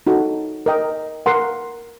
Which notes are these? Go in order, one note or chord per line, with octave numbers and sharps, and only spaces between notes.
D#4 F#4 A4
A#4 D#5 G5
A#4 F#5 C6